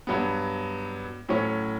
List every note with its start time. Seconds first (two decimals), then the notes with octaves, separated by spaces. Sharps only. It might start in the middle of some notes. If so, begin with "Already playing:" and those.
0.07 G2 F#3 B3
1.29 A2 F#3 C#4